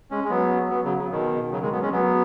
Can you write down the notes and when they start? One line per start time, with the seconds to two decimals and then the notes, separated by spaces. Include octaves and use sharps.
0.11 G#3 C#4
0.24 G#3
0.30 F#3 B3
0.71 F#3 B3
0.84 C#3 F#3
0.97 C#3
1.11 B2 D#3
1.51 C#3 F#3
1.62 D#3 G#3
1.72 F#3 B3
1.82 G#3 C#4
1.92 F#3 B3